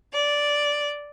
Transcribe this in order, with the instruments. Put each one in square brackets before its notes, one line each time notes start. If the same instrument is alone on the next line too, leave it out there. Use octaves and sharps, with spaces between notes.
[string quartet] D5